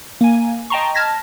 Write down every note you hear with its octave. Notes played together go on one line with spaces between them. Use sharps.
A#3 G#5
D#5 G5 A5 A#5 C6 C#6
A5 F6 G#6 A#6 B6